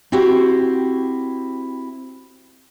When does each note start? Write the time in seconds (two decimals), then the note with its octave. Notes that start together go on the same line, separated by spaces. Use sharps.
0.12 C4 E4 F#4 G4 C5